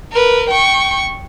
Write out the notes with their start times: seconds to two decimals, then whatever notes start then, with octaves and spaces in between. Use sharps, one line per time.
0.11 A#4 B4
0.50 G5 C#6